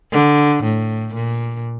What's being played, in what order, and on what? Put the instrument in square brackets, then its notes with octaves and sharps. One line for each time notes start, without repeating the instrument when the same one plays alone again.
[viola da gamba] D3
A2
A#2